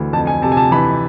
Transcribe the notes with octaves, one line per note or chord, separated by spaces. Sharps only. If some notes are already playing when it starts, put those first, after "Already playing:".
Already playing: D2 E3
F2 A5
G#5
C3 A5
G#5
A5
E3 B5